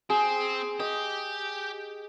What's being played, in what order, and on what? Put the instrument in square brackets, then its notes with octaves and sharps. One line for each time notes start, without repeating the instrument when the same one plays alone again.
[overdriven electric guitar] C4 [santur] G#4
[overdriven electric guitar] G4 [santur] D#5